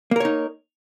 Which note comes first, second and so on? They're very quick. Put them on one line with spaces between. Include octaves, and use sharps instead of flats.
A#3 A#4 C#5 D#4